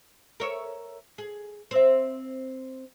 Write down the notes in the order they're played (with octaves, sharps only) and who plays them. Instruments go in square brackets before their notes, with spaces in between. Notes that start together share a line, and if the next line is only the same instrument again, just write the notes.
[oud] A#4 C#5 E5
G#4
C4 E5